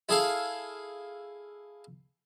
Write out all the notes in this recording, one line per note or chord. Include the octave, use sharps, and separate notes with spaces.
E4 G#4 A4 F5